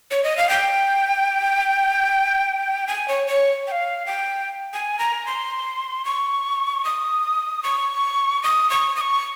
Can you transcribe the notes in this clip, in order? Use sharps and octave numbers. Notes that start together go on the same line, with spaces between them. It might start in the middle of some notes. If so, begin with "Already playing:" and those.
C#5
D#5
F5
G5
G#5
C#5
C#5
G5
F5
G5
G#5
A#5
C6
C#6
D#6
C#6
D#6
C#6
D#6
C#6